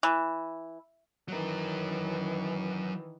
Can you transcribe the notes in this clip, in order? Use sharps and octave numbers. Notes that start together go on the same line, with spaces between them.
E3
D#3 E3 F#3 A#4